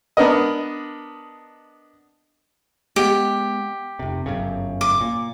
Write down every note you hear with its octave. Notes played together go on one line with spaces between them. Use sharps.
B3 D4 A#4 D#5
G#3 B3 G4
F1 C3
G1 F#2 C#3
D6
A#2